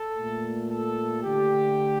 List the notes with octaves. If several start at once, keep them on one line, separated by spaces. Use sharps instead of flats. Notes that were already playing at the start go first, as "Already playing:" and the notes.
Already playing: A4
A#2 A3
A4
D3 A3 G4